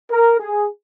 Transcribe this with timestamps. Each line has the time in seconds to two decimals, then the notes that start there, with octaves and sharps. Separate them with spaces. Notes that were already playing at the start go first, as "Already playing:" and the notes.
0.11 A#4
0.40 G#4